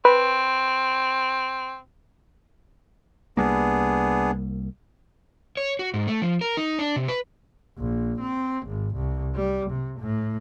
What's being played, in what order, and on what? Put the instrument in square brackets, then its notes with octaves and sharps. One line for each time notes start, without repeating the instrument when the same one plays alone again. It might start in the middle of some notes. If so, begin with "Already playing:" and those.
[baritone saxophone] C4 [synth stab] B4
[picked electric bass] C2 G3 A#3 [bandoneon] B3 D4 G#4
[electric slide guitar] C#5
F#4
G#2
A3
F3
A#4
D#4
D4
C3
B4
[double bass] A#1
C4
G#1
C2
G3
C3
A2